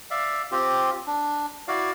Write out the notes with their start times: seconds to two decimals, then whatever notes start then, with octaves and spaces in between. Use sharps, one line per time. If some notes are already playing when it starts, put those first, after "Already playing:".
0.11 D5 E5 F5
0.52 C4 F4 G4
1.07 D4
1.68 E4 F#4 D5 F5